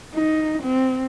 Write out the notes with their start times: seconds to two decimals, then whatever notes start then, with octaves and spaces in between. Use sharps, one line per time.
0.15 D#4
0.63 C4